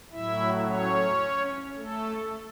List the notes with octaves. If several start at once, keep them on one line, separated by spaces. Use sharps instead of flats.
A2 F#3 E4 E5
C#4 C#5
A3 A4